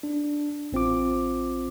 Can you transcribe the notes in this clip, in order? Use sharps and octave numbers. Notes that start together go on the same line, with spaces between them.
D4
A1 C4 F4 D6